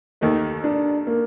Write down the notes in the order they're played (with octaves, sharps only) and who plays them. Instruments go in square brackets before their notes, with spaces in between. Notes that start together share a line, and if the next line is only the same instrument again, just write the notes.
[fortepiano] D#2 D#3 A3 [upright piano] D#4
[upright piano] D4
A#3